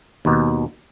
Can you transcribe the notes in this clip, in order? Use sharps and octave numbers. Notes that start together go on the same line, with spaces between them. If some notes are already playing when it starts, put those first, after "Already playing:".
D#2 B2